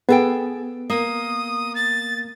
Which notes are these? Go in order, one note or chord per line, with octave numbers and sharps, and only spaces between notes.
B3 G#4 A4 G5
A#3 D#6
A6